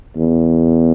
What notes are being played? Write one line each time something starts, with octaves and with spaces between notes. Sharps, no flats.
E2